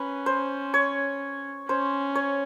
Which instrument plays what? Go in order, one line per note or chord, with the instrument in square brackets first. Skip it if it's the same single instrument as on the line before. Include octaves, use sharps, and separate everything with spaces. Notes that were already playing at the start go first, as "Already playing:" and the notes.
Already playing: [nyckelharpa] C#4 [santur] B4
[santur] C5
C#5
[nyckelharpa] C#4 [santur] C5
[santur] C#5